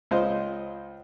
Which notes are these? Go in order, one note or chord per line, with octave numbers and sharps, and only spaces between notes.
C#2 C5 D#5 F5